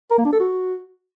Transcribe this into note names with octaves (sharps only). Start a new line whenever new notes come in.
A#4
A#3
D4
A4
F#4